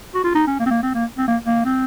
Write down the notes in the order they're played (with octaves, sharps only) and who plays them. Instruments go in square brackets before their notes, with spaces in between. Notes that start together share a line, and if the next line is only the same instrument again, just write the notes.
[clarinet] F#4
F4
D#4
C#4
A#3
C4
A#3
C4
A#3
C4
A#3
A#3
C4